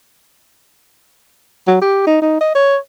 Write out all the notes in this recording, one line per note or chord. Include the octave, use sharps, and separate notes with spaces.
F#3
G4
D#4
D#4
D#5
C#5